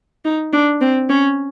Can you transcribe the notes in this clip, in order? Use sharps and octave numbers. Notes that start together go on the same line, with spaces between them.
D#4
D4
C4
C#4